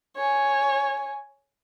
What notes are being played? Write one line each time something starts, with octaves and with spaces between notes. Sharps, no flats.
C#5 G#5